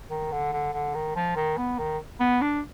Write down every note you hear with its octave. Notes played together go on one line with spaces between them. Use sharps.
D#3
D3
D3
D3
D#3
F3
D#3
B3
D#3
B3
D4